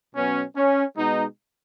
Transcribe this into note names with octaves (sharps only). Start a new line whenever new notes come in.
B2 F#3 B3 C#4
C#4
B2 G#3 B3 D#4